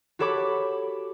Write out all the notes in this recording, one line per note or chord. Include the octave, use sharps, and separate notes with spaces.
F#4 G4 A4 C#5 B5 D6